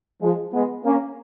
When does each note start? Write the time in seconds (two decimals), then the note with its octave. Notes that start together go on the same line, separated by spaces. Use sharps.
0.22 F3 G#3
0.54 G#3 B3
0.84 A#3 C#4